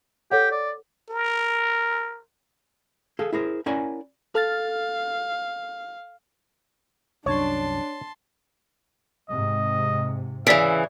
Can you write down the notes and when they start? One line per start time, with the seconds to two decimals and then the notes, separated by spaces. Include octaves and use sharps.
0.32 G4 A4 C#5 F#5
0.51 D5
1.10 A#4
3.19 G#4 A4 F5
3.33 E4 G#4 A#4 C5
3.66 C#4 E4 A#4 D5 F#5 G#5
4.35 A4 F5 F6 A6
7.26 C2 F#2 D4 C#5 A5 C6
9.29 G#2 C3 D#5
10.47 C#3 E3 D5 E5 B6 D7